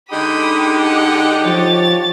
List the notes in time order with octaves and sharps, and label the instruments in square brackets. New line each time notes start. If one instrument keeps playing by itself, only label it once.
[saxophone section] D3 G#3 D#4 [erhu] G4 [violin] B5 D#6
[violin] F#5
[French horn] F3 [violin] C#5 A6